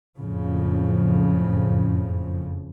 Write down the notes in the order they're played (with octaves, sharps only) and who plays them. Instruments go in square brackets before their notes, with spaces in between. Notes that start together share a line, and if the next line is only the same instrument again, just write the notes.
[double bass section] F#1 F2 A2 C#3 F3